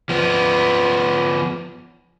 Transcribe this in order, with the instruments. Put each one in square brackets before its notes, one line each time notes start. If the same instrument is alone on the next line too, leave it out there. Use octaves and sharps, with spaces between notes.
[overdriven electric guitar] F3 B3